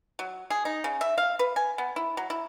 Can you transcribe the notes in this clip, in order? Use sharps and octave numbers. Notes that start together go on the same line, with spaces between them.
F#3
G#4
D#4
C#3
E5
F5
B4
G#5
B3
E4
F#3
E4